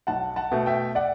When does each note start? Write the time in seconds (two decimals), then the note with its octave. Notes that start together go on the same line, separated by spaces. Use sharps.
0.07 B1 F#5 A5
0.36 F#5 A5
0.52 B2 A3
0.66 E5 G5
0.95 D5 F#5